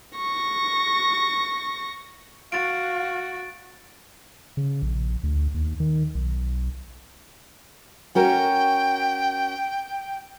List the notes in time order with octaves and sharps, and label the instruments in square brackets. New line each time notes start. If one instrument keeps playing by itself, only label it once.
[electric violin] C#6 A#6
[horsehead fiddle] F#4 [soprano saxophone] F5 [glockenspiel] A6 D7
[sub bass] C#3
A#1
D2
D#2
D#3
B1
[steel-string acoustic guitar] C#4 F#4 A#4 [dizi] G5